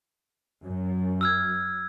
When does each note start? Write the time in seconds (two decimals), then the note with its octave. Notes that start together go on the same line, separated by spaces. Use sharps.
0.64 F#2
1.21 E6 F6 G#6